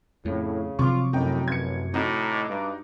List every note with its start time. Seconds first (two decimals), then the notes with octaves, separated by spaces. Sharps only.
0.25 F2 A2 C#3
0.79 C3 F3 F#3 F4 C#6 D6
1.13 F#2 A2 D#4 G5
1.48 A1 G#6 C#7
1.94 A2 D#4 F#4 D6
2.48 G2